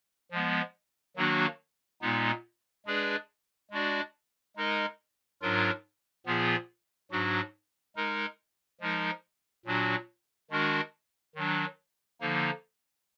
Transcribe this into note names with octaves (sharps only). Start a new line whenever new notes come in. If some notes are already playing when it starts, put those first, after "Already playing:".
F3 G#3 B3
D#3 F#3 A#3 D4 F#4
A#2 G#3 B3 D#4
G#3 D4 G#4 B4 D5
G#3 D4 F#4 D5
G#3 D#4 A#4 D#5
G#2 F#3 D4 F4 A#4
A#2 F3 B3 F4 G#4
G#2 F#3 D4 F#4
G#3 D#4 A#4
F3 G#3 D#4 A#4
A#2 F#3 D4 F#4
D#3 G#3 D4 F#4 A#4
D#3 F#3 D4
D3 F3 A#3 D#4